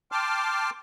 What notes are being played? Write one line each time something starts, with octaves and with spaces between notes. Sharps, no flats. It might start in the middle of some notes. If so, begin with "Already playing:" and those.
G5 A5 C6 D6 F6